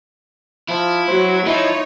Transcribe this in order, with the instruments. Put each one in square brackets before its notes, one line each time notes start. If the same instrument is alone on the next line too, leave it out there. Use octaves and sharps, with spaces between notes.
[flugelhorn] F3 [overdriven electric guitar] E4
[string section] F#3 [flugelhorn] C5
[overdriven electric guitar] F3 [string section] D#4 C#5 [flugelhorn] E4